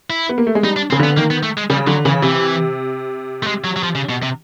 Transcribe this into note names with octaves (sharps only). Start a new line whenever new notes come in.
E4
B3
A#3
A3
G#3
G3 D#4
D4
C#3 C4
D3 B3
D#3 A#3
B3
A3
G#3
C#3 G3
D3 F#3
C#3 E3
C3 E3
A3
G#3
F#3
F#3
F3
C#3
B2
C3